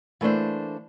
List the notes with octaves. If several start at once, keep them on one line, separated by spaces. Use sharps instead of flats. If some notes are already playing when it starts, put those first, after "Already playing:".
E3 A3 A#3 D4 C5